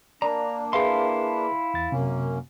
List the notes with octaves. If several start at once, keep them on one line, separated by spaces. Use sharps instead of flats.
A#3 D4 D5 A#5
E4 G#4 B4 E5 F5 C6
E2 A6
F#2 C3 A#3 C#4